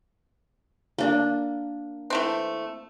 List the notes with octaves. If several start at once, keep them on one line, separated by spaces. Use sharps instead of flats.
A#3 D4
E3 A3 C4